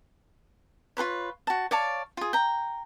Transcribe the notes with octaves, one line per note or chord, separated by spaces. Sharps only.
F4 G#4 B4 C#5
F#4 A5
C#5 D5 F5 A5
F4 G#4
G5 A#5